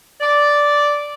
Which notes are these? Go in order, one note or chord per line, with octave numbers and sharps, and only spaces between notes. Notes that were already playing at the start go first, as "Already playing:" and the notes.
D5